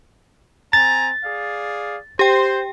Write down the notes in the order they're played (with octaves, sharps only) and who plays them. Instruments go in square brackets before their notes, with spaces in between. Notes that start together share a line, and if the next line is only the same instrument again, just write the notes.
[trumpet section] C4 G#5 A#5 [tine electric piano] A6
[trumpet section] G#4 D5 F5
[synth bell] G4 G5 [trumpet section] C5